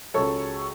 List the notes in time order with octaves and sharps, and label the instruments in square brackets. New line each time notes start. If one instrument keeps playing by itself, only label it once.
[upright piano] C#2 C#3 F#3 A4 C#5